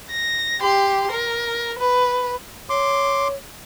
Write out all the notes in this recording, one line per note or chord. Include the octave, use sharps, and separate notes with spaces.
A#6
G4 C6
A#4
B4
C#5 C6 D6